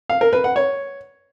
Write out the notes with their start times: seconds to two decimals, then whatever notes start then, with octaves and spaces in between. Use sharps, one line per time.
0.10 F5
0.21 A#4
0.33 B4
0.44 F#5
0.56 C#5